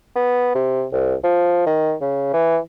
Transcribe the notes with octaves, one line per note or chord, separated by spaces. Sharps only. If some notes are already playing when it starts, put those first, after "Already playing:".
B3
C3
C2
F3
D#3
C#3
E3